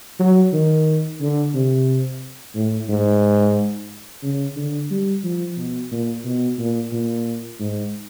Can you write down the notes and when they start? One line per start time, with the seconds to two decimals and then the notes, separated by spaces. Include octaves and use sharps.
0.20 F#3
0.53 D#3
1.21 D3
1.54 C3
2.55 A2
2.89 G#2
4.23 C#3
4.57 D3
4.90 G3
5.24 F3
5.57 B2
5.91 A#2
6.25 B2
6.59 A#2
6.92 A#2
7.60 G#2